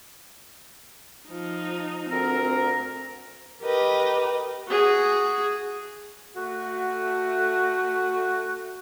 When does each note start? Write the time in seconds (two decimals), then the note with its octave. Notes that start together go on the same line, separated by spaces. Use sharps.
1.28 F3 D#4
2.10 D2 C4 A#4
3.62 G4 A#4 B4 D#5
4.67 F#4 G#4
6.36 A3 F#4